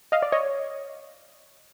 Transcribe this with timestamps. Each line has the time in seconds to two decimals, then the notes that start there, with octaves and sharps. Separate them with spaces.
0.12 D#5 F5
0.22 D5
0.32 C#5 D#5